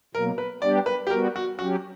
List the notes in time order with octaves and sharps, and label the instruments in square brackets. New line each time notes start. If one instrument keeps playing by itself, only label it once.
[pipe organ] B2 F#3 A#3 [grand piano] A#4
[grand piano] B4
[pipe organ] G3 B3 D4 G4 [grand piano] D5
[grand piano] B4
G4
[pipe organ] G3 B3 F#4 [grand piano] A#4
[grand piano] F#4
[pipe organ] F#3 C#4 G4 [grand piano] F#4